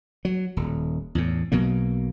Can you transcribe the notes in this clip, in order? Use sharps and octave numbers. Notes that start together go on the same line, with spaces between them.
F#3
D#1
E2 A2
B1 B2 F#3 A#3